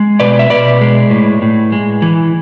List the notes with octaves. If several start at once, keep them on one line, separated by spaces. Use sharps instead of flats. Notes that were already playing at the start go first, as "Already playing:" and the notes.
Already playing: G#3
B2 B4 D5
E5
B2 B4 D5
G#3
A2
A2
G#3
E3